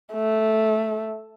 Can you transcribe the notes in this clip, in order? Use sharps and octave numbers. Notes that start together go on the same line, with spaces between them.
A3